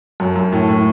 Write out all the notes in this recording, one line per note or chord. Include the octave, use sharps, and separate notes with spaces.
F#2
F#2
A2
A2